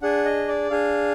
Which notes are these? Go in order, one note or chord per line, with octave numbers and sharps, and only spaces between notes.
D4 G#4 F#5
D#5
D5
D4 G#4 F5